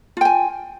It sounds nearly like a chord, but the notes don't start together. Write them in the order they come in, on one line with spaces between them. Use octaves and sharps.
F4 G5 G#5